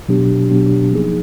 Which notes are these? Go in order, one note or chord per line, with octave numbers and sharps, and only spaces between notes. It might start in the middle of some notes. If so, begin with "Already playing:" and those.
B2 F#3 B3 D4 G4
B2 F#3 B3 D4 G4
F3 A#3 D#4 G#4